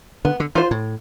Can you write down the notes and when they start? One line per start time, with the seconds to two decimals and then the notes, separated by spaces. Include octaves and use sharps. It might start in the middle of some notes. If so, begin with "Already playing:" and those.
0.25 D3 B3
0.40 D3
0.55 E3 F4 C5
0.71 A2